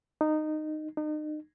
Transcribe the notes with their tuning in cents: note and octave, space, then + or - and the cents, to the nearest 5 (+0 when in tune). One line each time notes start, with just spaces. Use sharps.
D#4 -15
D#4 -35